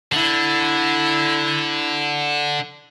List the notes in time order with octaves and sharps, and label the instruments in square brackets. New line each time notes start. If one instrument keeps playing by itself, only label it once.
[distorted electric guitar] D3 [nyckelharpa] E4